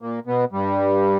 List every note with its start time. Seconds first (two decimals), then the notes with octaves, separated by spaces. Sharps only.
0.01 A#2 A#3
0.27 B2 B3
0.52 G2 G3